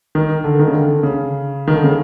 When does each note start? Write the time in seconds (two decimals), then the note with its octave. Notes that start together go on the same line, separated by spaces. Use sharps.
0.15 D#3
0.44 D3
0.59 D#3
0.68 C#3
0.74 D3
1.03 C#3
1.67 D#3
1.75 D3
1.84 C#3